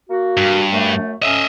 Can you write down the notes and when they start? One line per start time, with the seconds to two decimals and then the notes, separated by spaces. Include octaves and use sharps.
0.09 A#3 F#4
0.37 G2
0.72 F#2 A3
1.22 F#3 A3 C#4 D#5 E5